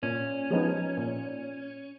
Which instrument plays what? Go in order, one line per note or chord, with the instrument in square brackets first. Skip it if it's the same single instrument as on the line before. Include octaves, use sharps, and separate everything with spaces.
[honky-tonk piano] A#2 [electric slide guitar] C#4
[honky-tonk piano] F3 G#3 B3 D#4
A#2